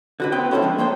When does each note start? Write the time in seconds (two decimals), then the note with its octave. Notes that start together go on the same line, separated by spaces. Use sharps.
0.20 D3 F#4 B4
0.32 B3 C4 G5
0.51 C#4 E4 A4 A#4 C5
0.62 F3 G#3 D4
0.78 A#3 C5 C#5 G5